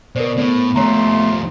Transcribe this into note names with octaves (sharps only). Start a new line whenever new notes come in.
B2 A#4 C5 D5
A2 B3
D#2 F3 A3 C#5 A#5 C6